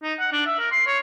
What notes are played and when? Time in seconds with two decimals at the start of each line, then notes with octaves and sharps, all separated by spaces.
0.03 D#4
0.20 F#5
0.32 D4
0.46 E5
0.59 A#4
0.72 C6
0.87 C#5